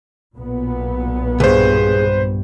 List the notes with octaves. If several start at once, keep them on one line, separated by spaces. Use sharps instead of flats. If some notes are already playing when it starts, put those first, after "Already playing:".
B1 A#2 B3
C2 G2 G#4 B4 C5